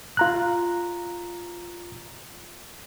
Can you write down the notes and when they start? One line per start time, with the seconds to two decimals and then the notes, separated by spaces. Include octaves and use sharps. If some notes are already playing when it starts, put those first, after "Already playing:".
0.17 F4 A#5 F#6